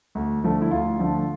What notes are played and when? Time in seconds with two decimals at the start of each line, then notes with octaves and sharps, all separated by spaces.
0.15 D2
0.44 D3 F3 A3
0.62 E4
0.71 D2 F4
0.99 D3 F3 A3